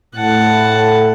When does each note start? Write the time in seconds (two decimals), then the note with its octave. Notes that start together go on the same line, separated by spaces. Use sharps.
0.15 A2 F#5 A5